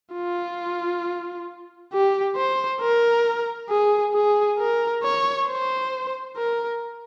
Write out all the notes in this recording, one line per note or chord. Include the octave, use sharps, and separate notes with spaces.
F4
G4
C5
A#4
G#4
G#4
A#4
C#5
C5
A#4